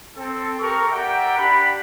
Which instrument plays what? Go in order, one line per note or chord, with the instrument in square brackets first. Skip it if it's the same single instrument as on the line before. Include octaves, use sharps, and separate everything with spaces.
[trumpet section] C4 A4
C4 G4 A4 A#4 C#6
G4 A#4 D5 E5 F#5 G5
D4 G4 F#5 B5